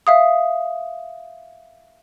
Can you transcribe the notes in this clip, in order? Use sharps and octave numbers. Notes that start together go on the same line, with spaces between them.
E5 F5 D#6